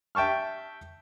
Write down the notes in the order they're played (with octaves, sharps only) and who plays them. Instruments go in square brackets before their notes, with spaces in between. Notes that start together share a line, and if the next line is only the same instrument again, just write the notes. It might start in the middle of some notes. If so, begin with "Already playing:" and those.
[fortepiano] E5 G5 A5 C#6 F6